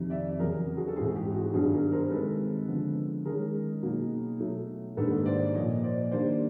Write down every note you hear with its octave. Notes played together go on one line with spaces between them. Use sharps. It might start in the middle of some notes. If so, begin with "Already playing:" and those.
Already playing: F2 C3 D#3
D5 E5
E2 C#3 F#3 G#4 A#4
F#4 G#4
A4
G#2 E3 G3 C4 F#4 G#4
G4
F#4 G#4
G2 D#3 F#3 B3 D4 F#4 G#4
G#4 A#4
A#4 C5
C3 D#3 G#3 A4 B4
D3 F3 G#3 B3
D#3 G#3 C#4 G#4 A#4
B2 F#3 A#3 D#4
B2 F#3 A3
G#2 D#3 G3 A#3 D4 A4 B4
C5 D5
A#2 F3 A#3 C#5 D#5
C5 D5
D#3 G3 A#3 D4 C5 D5